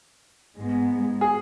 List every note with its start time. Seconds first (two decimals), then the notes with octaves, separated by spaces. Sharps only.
0.56 G#2 G#3 B3
1.21 G#4